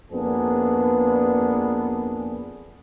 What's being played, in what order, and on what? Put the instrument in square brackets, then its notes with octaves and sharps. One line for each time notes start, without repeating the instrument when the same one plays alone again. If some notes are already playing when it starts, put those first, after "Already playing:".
[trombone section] F2 A#3 B3 D4 G#4 B4